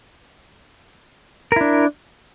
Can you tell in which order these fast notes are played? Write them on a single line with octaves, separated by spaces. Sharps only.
A#4 E4 D4